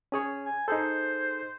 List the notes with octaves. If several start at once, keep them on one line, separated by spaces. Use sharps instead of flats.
C#4 G#4 C#5
G#5
D#4 G#4 A4 C5